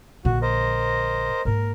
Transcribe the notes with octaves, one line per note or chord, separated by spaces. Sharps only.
A#1 D3 F#4
A#4 C5 D#5
G#2 A#3 A#4